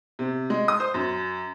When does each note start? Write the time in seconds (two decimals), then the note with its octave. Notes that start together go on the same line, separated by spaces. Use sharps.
0.19 C3
0.50 G#3
0.68 D#6
0.80 C5
0.94 F#2